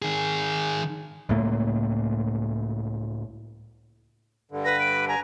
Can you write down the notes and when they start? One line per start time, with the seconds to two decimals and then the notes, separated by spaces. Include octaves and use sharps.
0.02 D#3 G#4
1.29 C#2 A2 A3 A#3
4.51 G2 D3
4.65 B4 A#6
4.80 D7
5.08 G#5 A#5